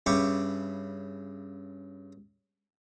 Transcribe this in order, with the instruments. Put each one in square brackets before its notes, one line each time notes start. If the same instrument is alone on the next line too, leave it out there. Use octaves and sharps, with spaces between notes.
[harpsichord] G2 C#3 E4 G4 B5 C#6